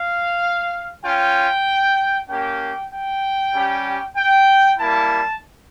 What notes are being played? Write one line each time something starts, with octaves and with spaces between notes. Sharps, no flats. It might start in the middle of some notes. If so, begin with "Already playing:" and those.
Already playing: F5
C#4 F4 G5
A#3 C#4 G4 G5
G5
G3 C#4 G4
G5
G3 A#3 E4 A5